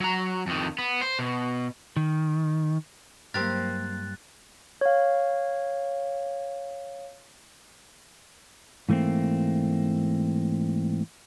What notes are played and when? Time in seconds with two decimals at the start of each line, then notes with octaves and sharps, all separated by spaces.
0.01 F#3 A#5
0.47 F2 D#3
0.79 B3
1.01 C5
1.19 B2
1.96 D#3
3.34 G2 F#3 A#3 C4 G4 A#4 F#6 A6
4.81 C#5 F5
8.89 G#2 E3 A3 A#3 C4